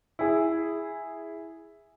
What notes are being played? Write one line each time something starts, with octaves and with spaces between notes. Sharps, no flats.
E4 G#4